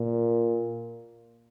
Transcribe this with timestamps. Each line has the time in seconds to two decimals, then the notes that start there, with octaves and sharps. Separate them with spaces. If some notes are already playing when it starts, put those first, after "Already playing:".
Already playing: A#2